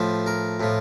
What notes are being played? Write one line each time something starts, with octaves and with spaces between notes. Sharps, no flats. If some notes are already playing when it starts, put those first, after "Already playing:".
Already playing: A2 F3 C5
A#4
A2 F3